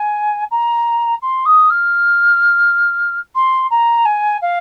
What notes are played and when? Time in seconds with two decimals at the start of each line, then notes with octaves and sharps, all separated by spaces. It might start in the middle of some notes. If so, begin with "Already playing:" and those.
Already playing: G#5
0.51 A#5
1.22 C6
1.45 D#6
1.70 F6
3.34 C6
3.70 A#5
4.05 G#5
4.41 F5